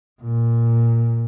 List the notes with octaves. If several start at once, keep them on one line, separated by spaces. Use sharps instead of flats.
A#2